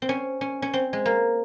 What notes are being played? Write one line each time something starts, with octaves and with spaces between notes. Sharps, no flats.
C4
C#4
C#4
C#4
C4
G#3
A#3